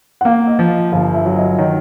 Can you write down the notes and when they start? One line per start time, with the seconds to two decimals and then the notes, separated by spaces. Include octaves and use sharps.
0.21 F#5
0.25 A#3 F5
0.47 D#5
0.59 F3
0.92 G1 F5
1.14 E5
1.26 F#3
1.37 D#5
1.58 D#3 C#5